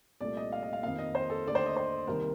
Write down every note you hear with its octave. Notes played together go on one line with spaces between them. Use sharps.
C2 A#2 A3 D5
D#5
F5
D#5
F5
F2 D#3 A#3 F5
D#5
C5
A4
D#2 D3 A3 D5
C5
D#5
C5
C2 C3 D#3 A#3 A#4